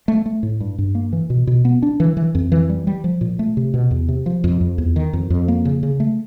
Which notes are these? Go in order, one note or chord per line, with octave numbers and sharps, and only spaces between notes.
A3
A3
A2
G2
G2
A#3
E3
B2
B2
B3
D4
E3
E3
F2
E3
G3
G3
F3
A#2
A3
C3
B2
E2
C3
F3
F2
F2
E2
D#3
F2
F2
A#3
C#3
C#3
A3